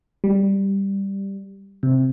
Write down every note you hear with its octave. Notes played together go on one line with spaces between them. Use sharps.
G3
C3